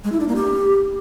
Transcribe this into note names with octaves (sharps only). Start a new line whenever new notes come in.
G#3
E4
D4
A#3
G4